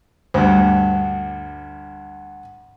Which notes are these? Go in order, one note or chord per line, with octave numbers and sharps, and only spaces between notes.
D2 G2